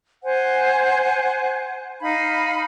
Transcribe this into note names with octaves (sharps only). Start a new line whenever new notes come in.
C5 F#5 G#5
D#4 F5 B5